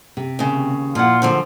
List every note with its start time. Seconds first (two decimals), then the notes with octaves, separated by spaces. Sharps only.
0.17 C3
0.39 D#2 C#3
0.95 A#2 F3 E4 F4 F#5
1.22 F#2 D3 F3 C5